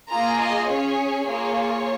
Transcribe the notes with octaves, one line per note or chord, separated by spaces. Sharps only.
A#3 F4 G#4 A#5
D#5
C#4 G#4 C#5
A#3 F4 G#4 C#5